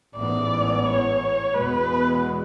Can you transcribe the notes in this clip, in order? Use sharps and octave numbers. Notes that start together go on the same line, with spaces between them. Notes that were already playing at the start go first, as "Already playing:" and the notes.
A1 G#2 E3 B3 D5
C#5
E2 B2 G#3 B3 B4